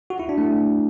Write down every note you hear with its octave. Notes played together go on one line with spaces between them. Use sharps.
F#4
E4
D4
A3